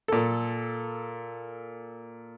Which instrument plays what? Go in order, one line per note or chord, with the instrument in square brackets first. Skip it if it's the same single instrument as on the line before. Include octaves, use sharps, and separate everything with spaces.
[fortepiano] A#2 A4